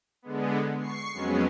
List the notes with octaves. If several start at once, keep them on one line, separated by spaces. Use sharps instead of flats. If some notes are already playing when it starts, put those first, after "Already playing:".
D3 G#3 B3
C#6 C7
F2 F#3 G#3 B3 C#4